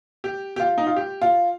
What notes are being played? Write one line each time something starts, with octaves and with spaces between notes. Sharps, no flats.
G4
G4
F4
D#4
F4
G4
F4